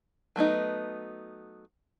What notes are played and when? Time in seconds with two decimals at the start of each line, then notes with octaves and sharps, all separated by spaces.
0.36 F#3 A3 B3 D#4